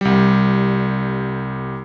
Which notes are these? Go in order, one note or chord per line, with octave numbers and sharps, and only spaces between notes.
C2 G3